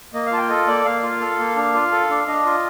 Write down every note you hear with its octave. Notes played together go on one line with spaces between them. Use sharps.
A#3 D#5
F5
F4 A5
G5
A4 D#5
A#3 D5
A#3 F5
F4
A4
A#3
D4
F4
A4
D4
D4 D#5
F4